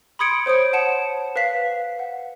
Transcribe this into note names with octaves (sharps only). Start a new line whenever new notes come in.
B5 C6 D#6 G#6 C#7 D7
C5 C#5 D#6 D7
F#5 A5 C#7 E7
B4 F5 B6
F#5